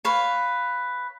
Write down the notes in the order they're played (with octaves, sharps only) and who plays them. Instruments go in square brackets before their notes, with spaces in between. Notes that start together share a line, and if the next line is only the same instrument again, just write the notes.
[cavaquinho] B4 C#5 F5